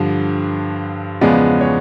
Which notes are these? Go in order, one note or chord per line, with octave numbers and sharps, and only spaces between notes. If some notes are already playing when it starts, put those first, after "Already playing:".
Already playing: G2 D3 F3
E2 C#3 F3 G#3 B3 D5
C#5